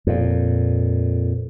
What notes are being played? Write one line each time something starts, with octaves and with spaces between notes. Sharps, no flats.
F2 A#2